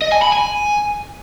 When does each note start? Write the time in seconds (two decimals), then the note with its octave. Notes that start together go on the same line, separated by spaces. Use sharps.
0.02 D#5
0.12 G#5
0.22 B5
0.32 G#5